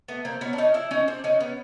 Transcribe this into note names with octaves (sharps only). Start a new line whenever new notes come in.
A3 B3
A#3 C4
B3 C#4
D4
C#4 D#4
D4 E4
C#4 D#4
C4 D4
C#4 D#4
B3 C#4